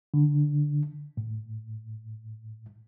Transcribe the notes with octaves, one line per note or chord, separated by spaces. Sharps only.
D3
A2